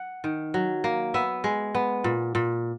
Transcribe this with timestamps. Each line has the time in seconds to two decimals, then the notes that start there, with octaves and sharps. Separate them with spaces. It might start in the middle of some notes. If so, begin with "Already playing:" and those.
Already playing: F#5
0.24 D#3
0.54 F#3
0.84 A#3
1.14 B3 E5
1.44 G#3
1.75 B3
2.04 A#2
2.35 A#2